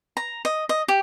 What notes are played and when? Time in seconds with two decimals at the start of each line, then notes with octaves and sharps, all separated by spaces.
0.17 A#5
0.45 D#5
0.69 D#5
0.88 G4